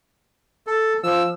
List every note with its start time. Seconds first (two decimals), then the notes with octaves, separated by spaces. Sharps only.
0.67 A4
1.03 F3 E6